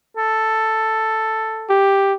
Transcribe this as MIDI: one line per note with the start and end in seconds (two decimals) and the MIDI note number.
0.17 1.81 69
1.70 2.14 67